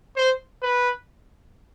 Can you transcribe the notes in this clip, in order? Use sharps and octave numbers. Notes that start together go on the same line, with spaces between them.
C5
B4